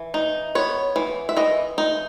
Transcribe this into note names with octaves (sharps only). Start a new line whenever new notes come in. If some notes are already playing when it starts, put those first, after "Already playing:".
Already playing: E3
D#4
B3 C#5
E3
E5
E3 D#5
D#4